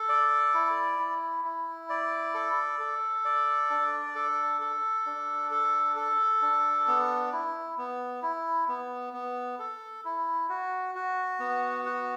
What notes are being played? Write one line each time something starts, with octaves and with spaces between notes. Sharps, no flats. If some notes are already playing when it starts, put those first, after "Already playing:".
Already playing: A4
D5
E4
E4
E4
D5
A4
A4
D5
D4
A4
A4
D4
A4
A4
D4
B3
E4
B3
E4
B3
B3
A4
E4
F#4
F#4
B3
F#4